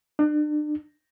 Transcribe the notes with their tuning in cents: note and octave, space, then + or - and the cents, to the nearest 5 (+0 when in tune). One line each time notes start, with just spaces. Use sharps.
D4 +40